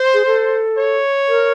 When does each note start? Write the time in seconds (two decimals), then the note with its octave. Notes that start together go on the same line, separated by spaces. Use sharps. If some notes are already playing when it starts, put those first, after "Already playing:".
Already playing: C5
0.14 G#4
0.26 A4
0.78 C#5
1.28 A#4